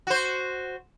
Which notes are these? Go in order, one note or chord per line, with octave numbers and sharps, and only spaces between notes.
F#4 C5